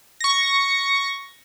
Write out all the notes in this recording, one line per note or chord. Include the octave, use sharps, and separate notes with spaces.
C#6 A#6